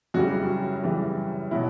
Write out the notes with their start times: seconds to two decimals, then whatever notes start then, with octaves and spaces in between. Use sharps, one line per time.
0.14 F#2 C#3 E3 G3 F#4
0.83 F#2 C#3 E3 G3
1.51 B2 F#3 E4